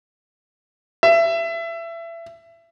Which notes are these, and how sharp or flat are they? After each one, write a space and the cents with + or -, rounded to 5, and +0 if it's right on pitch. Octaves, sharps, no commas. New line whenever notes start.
E5 +25